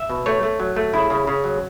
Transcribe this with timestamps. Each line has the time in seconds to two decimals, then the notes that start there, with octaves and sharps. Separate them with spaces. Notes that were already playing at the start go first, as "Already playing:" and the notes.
Already playing: E5
0.10 B2
0.26 A3 C#5
0.43 A3
0.60 F#3
0.76 A3
0.94 C#3 E4
1.10 C#3
1.27 C#3
1.44 F#3